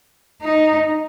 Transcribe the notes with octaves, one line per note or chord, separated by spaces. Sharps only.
D#4